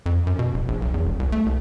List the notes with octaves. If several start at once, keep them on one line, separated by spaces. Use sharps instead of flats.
F2
F#2
B2
D1
A#1
B1
E2
E1
C2
A3
C2